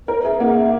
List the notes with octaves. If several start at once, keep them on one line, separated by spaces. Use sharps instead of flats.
A#4 B4
G#4 E5
A#3 F#5
E5